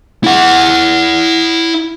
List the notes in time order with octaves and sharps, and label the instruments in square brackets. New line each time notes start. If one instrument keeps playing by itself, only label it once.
[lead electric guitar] E4 F#5